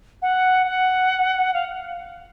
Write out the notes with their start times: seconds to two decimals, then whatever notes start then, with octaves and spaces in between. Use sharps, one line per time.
0.22 F#5
0.67 F#5
1.54 F5